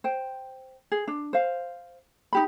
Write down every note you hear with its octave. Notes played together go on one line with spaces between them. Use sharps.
C5 G5
G#4
D4
C5 F5
D#4 G4 B5